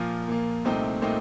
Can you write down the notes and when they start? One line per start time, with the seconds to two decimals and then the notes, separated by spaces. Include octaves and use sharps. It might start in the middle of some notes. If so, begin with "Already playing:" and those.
Already playing: A#2 F3 A#3
0.28 A#2 F3 A#3
0.65 C2 A#2 A3 C4 D#4
1.02 A#2 A3 C4 D#4